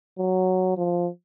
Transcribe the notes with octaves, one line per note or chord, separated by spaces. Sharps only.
F#3
F3